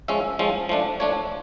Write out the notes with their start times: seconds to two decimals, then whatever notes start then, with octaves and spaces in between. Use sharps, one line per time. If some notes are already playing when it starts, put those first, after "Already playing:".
0.08 F3 G#3 C#4 E5
0.39 F3 G#3 C#4
0.69 F3 A3 D4
1.00 F3 A3 D4 C#5